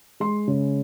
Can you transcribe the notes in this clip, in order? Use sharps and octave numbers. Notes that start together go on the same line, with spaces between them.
G#3 C6
C#3